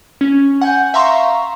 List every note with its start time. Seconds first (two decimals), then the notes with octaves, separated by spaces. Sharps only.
0.21 C#4
0.61 F#5 G#5 G6
0.94 E5 F5 A#5 C6 C#6